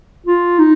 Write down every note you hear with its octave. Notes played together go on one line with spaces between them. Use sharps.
F4
D#4